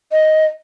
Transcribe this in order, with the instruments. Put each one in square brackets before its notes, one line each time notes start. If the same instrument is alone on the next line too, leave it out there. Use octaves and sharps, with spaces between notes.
[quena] D#5